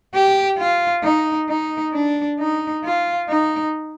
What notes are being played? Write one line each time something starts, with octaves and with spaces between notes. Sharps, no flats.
G4
F4
D#4
D#4
D4
D#4
F4
D#4